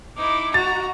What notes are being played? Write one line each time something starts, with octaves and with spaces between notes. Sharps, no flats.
D#4 E4 D6
F#4 A#5 A6